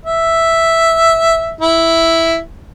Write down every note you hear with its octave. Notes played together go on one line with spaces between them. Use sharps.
E5
E4